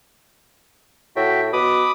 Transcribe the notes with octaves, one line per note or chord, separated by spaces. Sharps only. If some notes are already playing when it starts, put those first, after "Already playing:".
A2 F#4 E5 G5
B2 B5 D6 D#6